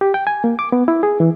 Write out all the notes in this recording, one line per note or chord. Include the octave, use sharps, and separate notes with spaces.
G4
G5
G#5
A#3
D6
B3
E4
G#4
E3